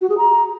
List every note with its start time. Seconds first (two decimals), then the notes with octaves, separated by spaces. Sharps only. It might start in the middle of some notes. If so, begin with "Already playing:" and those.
0.01 F#4
0.10 G#4
0.18 A#5